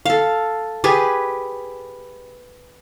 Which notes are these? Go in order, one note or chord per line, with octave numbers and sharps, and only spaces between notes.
A4 F5
G4 G#4 B4 G#5